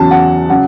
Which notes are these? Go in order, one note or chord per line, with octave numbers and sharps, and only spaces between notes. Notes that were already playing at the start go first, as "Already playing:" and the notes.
Already playing: E2 C#3 F#3 A5
F#5
C#3 F#3 F#5